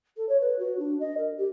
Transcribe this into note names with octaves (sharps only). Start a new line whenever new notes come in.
A4
C#5
B4
F#4
D4
D#5
A#4
G4